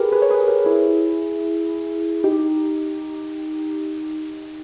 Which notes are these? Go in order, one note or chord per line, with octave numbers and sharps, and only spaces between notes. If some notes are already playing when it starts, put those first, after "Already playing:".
Already playing: G4 G#4 A#4 B4
G#4 B4
C#5
G#4 B4
G4 A#4
E4 G#4
D#4 G4